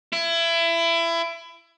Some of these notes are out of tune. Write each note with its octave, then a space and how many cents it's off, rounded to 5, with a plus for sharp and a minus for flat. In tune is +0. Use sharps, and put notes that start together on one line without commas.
E4 +25